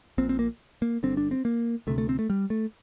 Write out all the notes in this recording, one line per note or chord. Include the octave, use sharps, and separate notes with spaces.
A#1 A#2 C4
C4
A#3
A#3
G1 G2 D3 C4
D4
C4
A#3
D2 C3 A3
A3
C4
A3
G3
A3